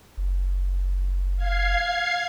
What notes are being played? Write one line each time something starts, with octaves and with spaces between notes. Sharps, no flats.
F#1
F5 G#6 C7